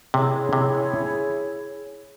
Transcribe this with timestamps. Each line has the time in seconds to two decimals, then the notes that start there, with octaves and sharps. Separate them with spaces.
0.14 C3 E4 G#4 C#5
0.53 C3